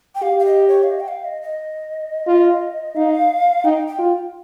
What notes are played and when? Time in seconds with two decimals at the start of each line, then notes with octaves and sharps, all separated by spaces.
0.15 G5
0.22 G4 F5
0.40 F5
0.45 D#5
0.68 C#5
0.83 F5
0.91 D#5
1.00 G5
1.08 F5
1.25 D#5
1.42 D#5
2.27 F4
2.96 D#4 F5
3.64 D#4 G5
3.87 G5
3.99 F4